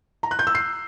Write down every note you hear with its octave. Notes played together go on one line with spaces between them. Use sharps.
A#5
F#6
G6
E6
C7